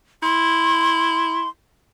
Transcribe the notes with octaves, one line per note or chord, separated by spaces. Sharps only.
E4 C6